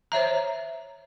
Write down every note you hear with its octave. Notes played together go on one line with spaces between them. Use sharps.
C5 C#5 E5 A#5